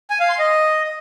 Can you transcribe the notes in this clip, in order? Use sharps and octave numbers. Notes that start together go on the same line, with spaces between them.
G#5
F5
C6
D#5